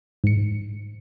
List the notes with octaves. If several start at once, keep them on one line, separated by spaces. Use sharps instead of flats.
G#2 C#7